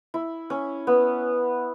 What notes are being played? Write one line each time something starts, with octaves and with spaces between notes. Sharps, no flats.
E4
C#4
B3